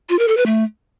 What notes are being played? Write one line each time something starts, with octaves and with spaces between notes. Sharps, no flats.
F4
A#4
A4
B4
A3